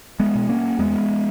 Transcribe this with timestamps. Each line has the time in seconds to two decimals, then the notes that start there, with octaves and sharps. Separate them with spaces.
0.20 G#3 B3
0.35 B2
0.49 A#3 C#4
0.79 E2 G#3 B3